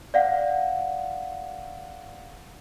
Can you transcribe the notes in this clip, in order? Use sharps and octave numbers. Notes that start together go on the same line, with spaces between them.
D5 F5 F#5